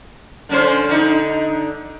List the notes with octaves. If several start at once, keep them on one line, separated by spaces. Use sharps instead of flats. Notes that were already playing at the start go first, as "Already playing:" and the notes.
D3 C#4 C5
D3 D#4